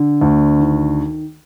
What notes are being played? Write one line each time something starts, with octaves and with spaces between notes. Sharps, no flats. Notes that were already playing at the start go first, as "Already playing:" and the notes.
Already playing: D3
D2
D#3